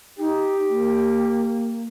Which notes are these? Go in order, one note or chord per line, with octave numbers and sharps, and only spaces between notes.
D#4 G4
A#3